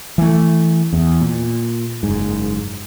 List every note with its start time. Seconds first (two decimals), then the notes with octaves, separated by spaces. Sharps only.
0.18 E3 A3
0.93 E2
1.21 A#2
2.03 F#1 G#2